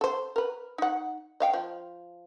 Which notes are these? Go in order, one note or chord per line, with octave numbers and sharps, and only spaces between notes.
A4 C5
A#4 B4
D#4 F#5
D#5 F5 G5
F3